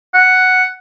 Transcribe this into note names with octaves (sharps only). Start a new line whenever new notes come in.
F#5